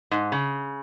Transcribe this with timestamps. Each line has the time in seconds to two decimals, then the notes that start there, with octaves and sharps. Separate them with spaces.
0.11 G#2
0.32 C#3